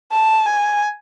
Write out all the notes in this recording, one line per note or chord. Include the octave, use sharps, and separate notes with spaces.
A5
G#5